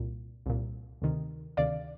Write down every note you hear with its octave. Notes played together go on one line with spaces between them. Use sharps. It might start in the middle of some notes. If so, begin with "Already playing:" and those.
Already playing: C2 A#2
C2 A#2
D2 C3 D#3
D2 C3 D#3 D5 F5